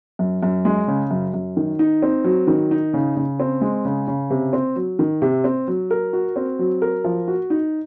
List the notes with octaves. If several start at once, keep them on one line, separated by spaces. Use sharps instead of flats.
F#2
F#2
G#3
C#3
F#2
F#2
D#3
D#4
C4
F#3
D#3
D#4
C#3
C#3
C4
G#3
C#3
C#3
C3
C4
F#3
D#3
C3
C4
F#3
A#4
F#4
C4
F#3
A#4
F3
F#4
D#4